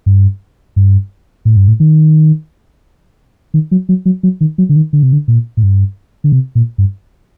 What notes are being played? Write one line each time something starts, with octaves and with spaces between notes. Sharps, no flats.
G2
G2
A2
G2
A2
D#3
D#3
F#3
F#3
F#3
F#3
D#3
F#3
D3
D#3
D3
C3
D3
A#2
A2
G2
D3
C3
A#2
G2